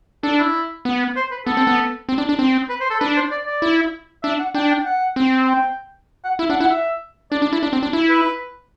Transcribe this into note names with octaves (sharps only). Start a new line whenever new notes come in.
D4 A4
E4
B3
C5
B4
B3 A4
C4
B3
C4
D4
D4
C4
B4
C5
A4
D4 B4
C5
D5
D5
E4
D4 E5
F#5
D4 G5
G5
F#5
C4
G5
F#5
E4 E5
D4 F#5
E4 F#5
E5
D4 D5
D4
E4
D4
C4
D4
E4
B4